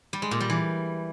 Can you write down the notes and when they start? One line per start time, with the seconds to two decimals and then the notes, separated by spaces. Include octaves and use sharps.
0.13 G3
0.22 G#3
0.31 A#2
0.40 G3
0.50 E3